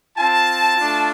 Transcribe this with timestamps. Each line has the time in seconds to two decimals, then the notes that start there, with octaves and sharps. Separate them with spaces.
0.17 C4 F4 A5
0.77 A3 D4 F4